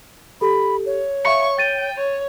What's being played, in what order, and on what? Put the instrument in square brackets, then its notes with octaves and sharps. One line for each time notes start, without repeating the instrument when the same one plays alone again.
[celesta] G4 A4 [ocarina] B5
[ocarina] C#5
[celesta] E5 F5 C#7 [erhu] C#6
[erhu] G5 [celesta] A6 D#7
[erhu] C#5